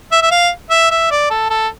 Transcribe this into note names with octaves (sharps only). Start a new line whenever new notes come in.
E5
E5
F5
E5
E5
D5
A4
A4